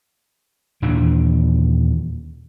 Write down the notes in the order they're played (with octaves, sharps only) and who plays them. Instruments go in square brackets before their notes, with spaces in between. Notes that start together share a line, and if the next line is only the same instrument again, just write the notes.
[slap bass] D#2 A#2 E3 D4